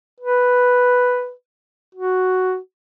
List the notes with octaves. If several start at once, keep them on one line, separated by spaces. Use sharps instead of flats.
B4
F#4